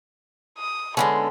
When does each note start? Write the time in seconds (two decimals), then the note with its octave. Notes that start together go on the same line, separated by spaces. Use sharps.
0.58 D#6
0.97 D3 F3 G#3 B3 C#4 A4